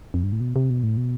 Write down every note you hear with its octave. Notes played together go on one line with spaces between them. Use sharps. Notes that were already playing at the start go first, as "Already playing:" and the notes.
F2
G2
A2
B2
C3
B2
A2
B2